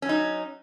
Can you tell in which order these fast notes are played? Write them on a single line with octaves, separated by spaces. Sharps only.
C#4 F#3 D#4